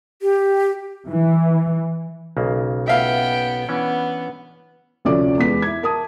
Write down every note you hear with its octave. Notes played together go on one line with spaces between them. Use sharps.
G4
E3
B1 C#3 A#3
B3 E5 F5 G5
E3 B3 C#4 D4
F1 D2 F3 C#4 D5 D6
E2 G#3 B3 B6
E4 G#6
A#4 A5 D#6